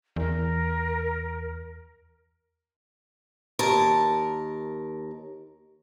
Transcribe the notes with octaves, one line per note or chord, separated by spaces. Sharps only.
E2 A#4
D#2 A#4 A5